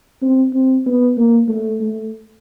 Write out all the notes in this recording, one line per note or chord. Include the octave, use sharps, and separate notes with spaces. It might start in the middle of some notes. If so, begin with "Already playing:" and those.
C4
C4
B3
A#3
A3
A3